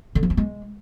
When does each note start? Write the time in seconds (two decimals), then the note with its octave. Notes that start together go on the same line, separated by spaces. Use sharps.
0.15 D3
0.23 F3
0.30 C4
0.37 G#3